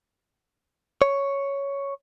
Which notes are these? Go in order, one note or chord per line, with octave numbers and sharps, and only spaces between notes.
C#5